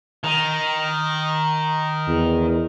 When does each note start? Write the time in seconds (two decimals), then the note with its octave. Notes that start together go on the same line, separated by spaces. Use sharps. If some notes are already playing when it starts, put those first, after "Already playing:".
0.24 D#3
2.08 E2